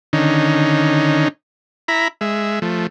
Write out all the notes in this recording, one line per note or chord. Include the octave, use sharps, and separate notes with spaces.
D3 D#3 C#4 D#4
E4 A#5 B5
G#3 E5
F3 A3